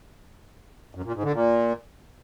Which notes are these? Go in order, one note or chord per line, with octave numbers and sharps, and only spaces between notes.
F#2
A#2
G#2
D3
A#2